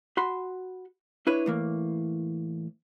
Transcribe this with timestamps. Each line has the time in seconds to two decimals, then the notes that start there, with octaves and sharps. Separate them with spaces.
0.17 F#4 B5 C6
1.27 D4 E4 B4 C#5
1.46 A2 E3 A#3